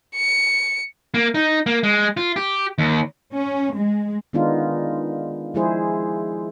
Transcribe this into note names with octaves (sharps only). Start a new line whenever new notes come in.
C#7
A#3
D#4
A#3
G#3
F4
G4
D#2
C#4
G#3
D#3 G#3 B3 D4 D#4 F4
F3 G#3 E4 G#4 C5